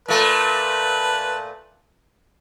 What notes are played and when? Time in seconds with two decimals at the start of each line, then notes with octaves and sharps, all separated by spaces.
0.08 A#2 A3 B4 A5